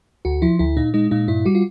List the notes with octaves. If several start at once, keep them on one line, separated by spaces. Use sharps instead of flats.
D2 F#4
F3 E4
D2 E4
A#2 D#4
G#3 D#4
A#2 D#4
G2 E4
G3 F#4
F4